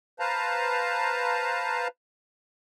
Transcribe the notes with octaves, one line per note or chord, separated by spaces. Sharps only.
B4 C5 F5 A5 A#5